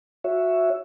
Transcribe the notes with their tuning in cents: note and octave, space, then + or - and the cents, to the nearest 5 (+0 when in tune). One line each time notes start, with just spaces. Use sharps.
F#4 -15 C#5 +0 E5 +5